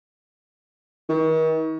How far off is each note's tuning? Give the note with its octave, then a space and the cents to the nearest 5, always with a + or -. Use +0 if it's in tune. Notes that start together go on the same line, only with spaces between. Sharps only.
D#3 +40